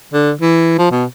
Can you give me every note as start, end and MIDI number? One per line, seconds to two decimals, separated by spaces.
0.13 0.31 50
0.41 0.78 52
0.78 0.91 53
0.91 1.04 47